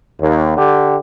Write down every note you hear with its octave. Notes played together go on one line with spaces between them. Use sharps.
D#2
D3 G4